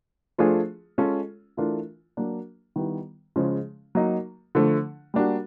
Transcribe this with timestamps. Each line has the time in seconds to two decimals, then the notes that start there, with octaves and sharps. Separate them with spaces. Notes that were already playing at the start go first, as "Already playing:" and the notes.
0.38 F3 A3 D4 F4 G#4
0.98 G#3 C#4 F4 A4
1.57 E3 A3 D4 F4 A#4
2.17 F#3 A#3 D4
2.76 D#3 G3 B3 E4
3.36 C#3 F3 G#3 C#4
3.95 F#3 A#3 D#4
4.55 D3 F3 A3
5.14 G3 A#3 D4 F#4